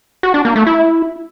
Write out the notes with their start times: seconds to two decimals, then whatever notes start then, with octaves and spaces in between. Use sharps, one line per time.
0.23 F#4
0.34 D4
0.45 A#3
0.56 A3
0.67 E4